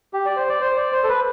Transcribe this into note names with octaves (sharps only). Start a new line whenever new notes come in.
G4
D5
C5
D5
C5
D5
C5
A4
B4